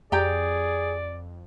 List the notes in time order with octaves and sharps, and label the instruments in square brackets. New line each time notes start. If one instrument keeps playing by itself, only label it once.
[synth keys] F2 [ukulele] G4 G5 A#5 [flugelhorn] G#4 [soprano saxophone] D5